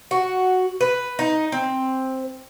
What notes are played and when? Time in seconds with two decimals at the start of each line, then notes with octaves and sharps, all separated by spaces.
0.11 F#4
0.81 B4
1.19 D#4
1.52 C4